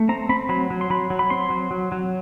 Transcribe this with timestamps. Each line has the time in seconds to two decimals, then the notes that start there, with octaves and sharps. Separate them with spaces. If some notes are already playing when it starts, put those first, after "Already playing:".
Already playing: A3
0.09 C4 A#5
0.29 C4 B5
0.49 F#3 B5
0.70 F#3
0.81 C6
0.90 F#3 B5
1.10 F#3
1.19 B5
1.30 C4 C6
1.50 F#3
1.71 F#3
1.92 F#3